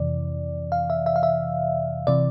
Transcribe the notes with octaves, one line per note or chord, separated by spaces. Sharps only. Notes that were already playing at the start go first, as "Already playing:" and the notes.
Already playing: F2 C3 E3 D5
F5
E5
E5
F5
E5
C3 E3 D5